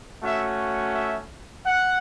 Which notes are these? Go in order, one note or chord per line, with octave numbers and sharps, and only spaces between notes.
A3 C#4 F#4 E5
E5
F#5